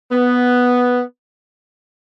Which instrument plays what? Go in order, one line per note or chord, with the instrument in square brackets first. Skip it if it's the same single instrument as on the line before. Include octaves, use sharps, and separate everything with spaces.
[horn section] B3